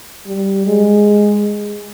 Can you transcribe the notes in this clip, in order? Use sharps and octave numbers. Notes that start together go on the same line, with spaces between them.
G3
G#3